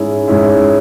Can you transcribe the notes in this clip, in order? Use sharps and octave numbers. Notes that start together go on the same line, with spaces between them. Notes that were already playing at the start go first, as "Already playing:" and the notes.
Already playing: G#2 G#3 C#4 E4
G#2 G#3 C#4 E4